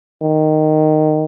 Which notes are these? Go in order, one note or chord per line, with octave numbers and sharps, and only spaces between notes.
D#3